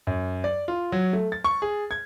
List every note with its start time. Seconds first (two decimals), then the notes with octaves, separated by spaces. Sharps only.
0.07 F#2
0.44 D5
0.68 F4
0.92 F#3
1.13 A3
1.32 A6
1.44 C#6
1.62 G#4
1.91 G#6